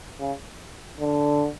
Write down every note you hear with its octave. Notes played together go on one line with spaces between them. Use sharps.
C#3
D3